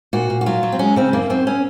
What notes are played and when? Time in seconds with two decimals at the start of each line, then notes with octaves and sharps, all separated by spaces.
0.13 A#2 F#4
0.30 A#2
0.41 F#4
0.46 F#3 F4
0.63 F#3
0.72 C4
0.79 G#3 C#4
0.96 C#3 C4
1.13 F#2 A#3
1.30 F#2 C4
1.47 C#4